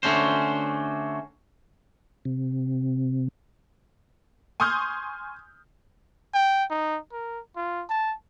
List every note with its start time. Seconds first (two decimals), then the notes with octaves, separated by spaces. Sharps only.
0.03 D3 A3 C#4 F#4 C5
2.25 C3
4.60 G#5 C6 C#6 D#6 F6 G6
6.34 G5
6.70 D#4
7.12 A#4
7.56 F4
7.89 A5